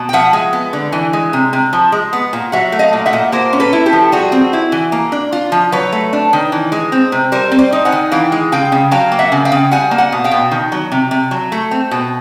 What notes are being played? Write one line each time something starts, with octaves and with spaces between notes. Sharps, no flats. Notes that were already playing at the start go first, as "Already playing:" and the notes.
Already playing: B2
G5
F3 E5 F#5
G#3
B3
D3
E3
G#3
C3
C3
F3
G#3
B3
A#2
F#3 E5 F#5
A3
D#5 F5
A#2
E5 F#5
A#2
A#3 A#4 C5
C#4
A4 B4
E4
G4 A4
F3
G3 F#4 G#4
C4
E4
E3
A#3
D4
F4
F3
F#3 B4 C#5
A3
D4
D#3
E3
G#3
C4
C3
G3 A#4 C5
C4
C5 D5
D#4
F#5 G#5
D#3
E3 F5 G5
G#3
C#3 F5 G5
C#3
F#3 F5 G5
A#3
E5 F#5
C#3
F5 G5
C#3
G3 F#5 G#5
A#3
F#5 G#5
B2
F5 G5
B2
D#3
F#3
C3
C3
F#3
A3
C4
B2